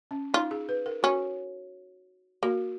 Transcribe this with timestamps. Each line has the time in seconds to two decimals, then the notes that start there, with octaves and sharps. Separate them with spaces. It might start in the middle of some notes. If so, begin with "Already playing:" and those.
0.11 C#4
0.34 D#4 F4
0.51 G#4
0.69 B4
0.86 A#4
1.03 C#4 F#4
2.43 A#3 F#4